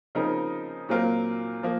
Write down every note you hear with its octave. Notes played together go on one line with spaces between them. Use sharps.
C#3 F3 C4 D#4 A#4
A#2 F#3 C4 F4 A#4
F3 A#3